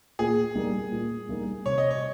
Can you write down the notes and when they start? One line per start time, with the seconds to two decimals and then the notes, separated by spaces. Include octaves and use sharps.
0.19 A#2 G#4
0.55 G3 A#3 D#4
0.92 A#2
1.29 G3 A#3 D#4
1.66 C3 C#5
1.78 D#5
1.91 C#5